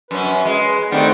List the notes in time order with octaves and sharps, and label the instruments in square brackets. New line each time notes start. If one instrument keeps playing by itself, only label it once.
[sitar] F#2 C#4 [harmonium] B4
[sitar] G#3
[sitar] D#3 G3 [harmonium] A3 C4 F#5